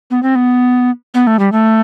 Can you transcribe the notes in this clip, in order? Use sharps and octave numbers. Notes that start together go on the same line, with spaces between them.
B3
C4
B3
B3
A3
G3
A3